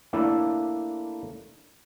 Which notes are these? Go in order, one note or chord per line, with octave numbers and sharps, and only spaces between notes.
A3 A#3 D4 E4 A4